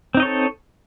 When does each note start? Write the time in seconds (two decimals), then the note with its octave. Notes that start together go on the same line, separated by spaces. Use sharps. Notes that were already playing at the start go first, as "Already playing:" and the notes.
0.15 C4
0.17 D#4
0.20 D#5
0.23 C#5
0.25 A4